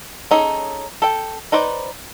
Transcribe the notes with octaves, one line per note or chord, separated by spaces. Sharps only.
C#4 D#4 G#4 A4
A4 G5
D#4 B4 C5 D5